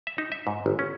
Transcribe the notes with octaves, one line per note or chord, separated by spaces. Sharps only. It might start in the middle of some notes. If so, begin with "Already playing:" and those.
E5
D#4
E5
G#2
G1
C#4